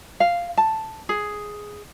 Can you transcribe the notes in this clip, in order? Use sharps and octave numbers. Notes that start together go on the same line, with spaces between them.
F5
A5
G#4